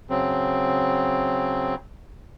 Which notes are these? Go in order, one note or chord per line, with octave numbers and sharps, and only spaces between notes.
C#3 F#3 C4